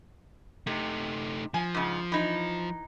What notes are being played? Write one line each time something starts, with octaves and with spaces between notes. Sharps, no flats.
C3 A3 D#4
F3 G#5
G#2 C#3
E3 D#4